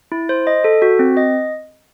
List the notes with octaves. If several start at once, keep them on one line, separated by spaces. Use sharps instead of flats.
E4
C5
D#5
A4
F#4
C4
D#5